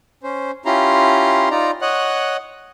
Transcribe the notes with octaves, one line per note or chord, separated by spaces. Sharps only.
C#4 C5
C#4 E4 F4 G4 A#5 C6
D#4 F4 D5 A#5
C#5 D#5 F#5 F#6